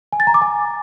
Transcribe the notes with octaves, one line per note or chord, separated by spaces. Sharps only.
G#5
A6
A#5
D6
G#5